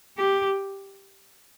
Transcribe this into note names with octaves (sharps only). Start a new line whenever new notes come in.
G4